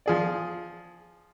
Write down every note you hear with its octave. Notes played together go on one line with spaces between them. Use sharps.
F3 G#4 D5